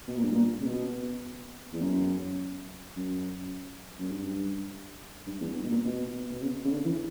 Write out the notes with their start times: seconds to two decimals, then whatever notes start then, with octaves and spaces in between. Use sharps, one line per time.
0.08 B2
0.16 A#2
0.24 G2
0.32 A#2
0.60 C#3
0.66 B2
1.73 E2
1.81 F#2
2.96 F#2
3.99 F#2
4.12 G2
5.27 G2
5.41 E2
5.56 G2
5.64 B2
5.70 A#2
5.85 B2
6.32 B2
6.42 C#3
6.65 C#3
6.71 D3
6.85 E3